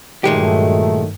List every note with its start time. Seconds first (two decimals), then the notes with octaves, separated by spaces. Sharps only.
0.24 G2 A#2 D#3 F#3 G#3 A3 G4